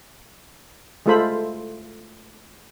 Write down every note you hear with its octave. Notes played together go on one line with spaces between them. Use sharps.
G#3 A3 F4 A4 C5 B5